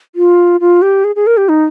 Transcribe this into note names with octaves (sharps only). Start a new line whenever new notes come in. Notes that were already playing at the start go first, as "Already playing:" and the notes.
F4
F4
G4
G#4
G#4
A#4
G4
D#4